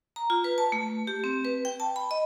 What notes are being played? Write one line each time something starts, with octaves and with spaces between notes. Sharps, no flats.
A#5
F4
B4
A5
A3
G4
C4
B4
G5
A5
B5
D#5